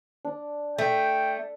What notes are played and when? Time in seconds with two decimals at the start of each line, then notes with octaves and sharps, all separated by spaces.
0.25 D4
0.78 A3 G5